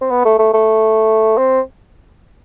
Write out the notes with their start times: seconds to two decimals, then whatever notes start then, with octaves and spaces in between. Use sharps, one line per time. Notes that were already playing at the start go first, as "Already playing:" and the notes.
0.01 C4
0.10 B3
0.25 A3
0.39 A3
0.53 A3
1.38 C4